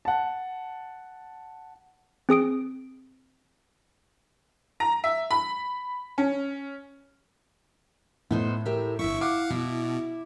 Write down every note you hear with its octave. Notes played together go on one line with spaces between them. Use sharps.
F#5 A5
C4 G#4 D#6 D7
A#5
E5
B5
C#4
A2 B3 D#4 C5
G4 A#4 E5
G1 E4 E5 C#6
F5 F#5 D6
B2 E4